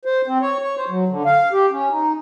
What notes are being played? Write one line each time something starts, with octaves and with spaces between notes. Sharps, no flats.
C5
C4
C#5
C#5
C5
F#3
D3
F5
G4
C#4
D#4